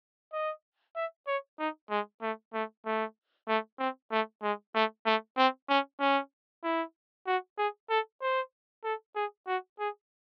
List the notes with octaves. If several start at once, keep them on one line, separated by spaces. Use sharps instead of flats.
D#5
E5
C#5
D#4
G#3
A3
A3
A3
A3
C4
A3
G#3
A3
A3
C4
C#4
C#4
E4
F#4
G#4
A4
C5
A4
G#4
F#4
G#4